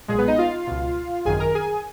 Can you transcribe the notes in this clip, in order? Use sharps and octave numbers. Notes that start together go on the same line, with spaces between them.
B1 A#2 G#3 G#4
B3 B4
D#4 D#5
F4 F5
C#2 B2
G#1 F#2 D#3 G#4 G#5
A#4 A#5
G#4 G#5